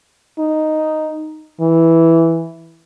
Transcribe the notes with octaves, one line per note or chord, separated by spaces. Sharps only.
D#4
E3